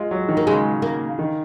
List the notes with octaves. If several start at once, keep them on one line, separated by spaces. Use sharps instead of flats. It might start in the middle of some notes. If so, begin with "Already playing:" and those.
Already playing: G#3 F4
F#3
D#3
A#3
C#3 G#3
A#3
D#3